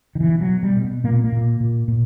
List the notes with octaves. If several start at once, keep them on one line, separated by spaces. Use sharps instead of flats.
D#3
B2 E3
F#3
B2
G3
B2
B3
A#2 A#3
B3
A#3
A#2
A#2
A#2